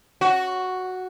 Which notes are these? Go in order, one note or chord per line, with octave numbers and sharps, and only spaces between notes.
F#4